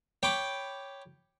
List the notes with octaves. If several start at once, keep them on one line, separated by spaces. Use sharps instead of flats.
C#5 G5 B5 D6